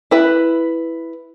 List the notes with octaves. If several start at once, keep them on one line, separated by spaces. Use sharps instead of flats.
E4 B4